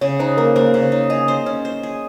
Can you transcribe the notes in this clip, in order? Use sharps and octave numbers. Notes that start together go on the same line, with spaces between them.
C#3 C#5
D#4 C5
A#3 A#4
A#3 C5
C#3
C#5
D#4
G#4 D#5
C5
C#4
C5
G#4